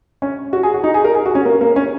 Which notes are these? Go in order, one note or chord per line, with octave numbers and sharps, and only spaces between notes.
C#4
F#4
G#4
F#4
D#4
G#4
A#4
G#4
F#4
C#4
A#3
A#3
C#4